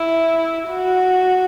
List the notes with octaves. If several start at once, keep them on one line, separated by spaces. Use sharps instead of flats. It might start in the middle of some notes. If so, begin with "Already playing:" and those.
Already playing: E4
F#4